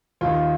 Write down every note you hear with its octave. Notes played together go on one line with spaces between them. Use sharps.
D#2 D#3 F4